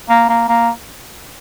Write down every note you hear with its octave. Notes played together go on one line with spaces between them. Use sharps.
A#3
A#3
A#3